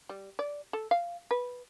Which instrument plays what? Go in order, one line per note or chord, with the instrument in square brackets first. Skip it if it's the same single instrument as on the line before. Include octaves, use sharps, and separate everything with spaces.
[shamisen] G3
D5
A4
F5
B4